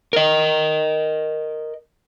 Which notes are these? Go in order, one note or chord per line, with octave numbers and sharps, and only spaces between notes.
A#4 D#5